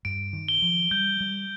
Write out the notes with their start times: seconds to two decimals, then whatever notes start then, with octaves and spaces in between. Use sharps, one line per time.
0.05 G2 D7
0.33 D#3
0.48 G7
0.62 F3
0.91 G3 G6
1.21 G3
1.34 G7